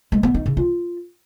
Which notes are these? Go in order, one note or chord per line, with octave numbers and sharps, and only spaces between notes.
G#3
B3
D#4
C#3
F4